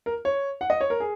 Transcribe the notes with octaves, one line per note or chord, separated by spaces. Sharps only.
A#4
C#5
F#5
D#5
C#5
A#4
G#4